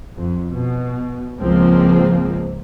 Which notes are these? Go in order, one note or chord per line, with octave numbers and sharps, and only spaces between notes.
F2
B2
C#2 G#2 F3 G#3 A#3 C4